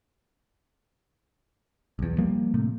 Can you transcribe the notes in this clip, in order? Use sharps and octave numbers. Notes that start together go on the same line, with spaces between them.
B1 E2
F3 G3 A#3
A2 C3 A3